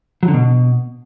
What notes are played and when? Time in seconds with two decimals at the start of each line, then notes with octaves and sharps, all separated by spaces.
0.23 F#3
0.28 D3
0.34 B2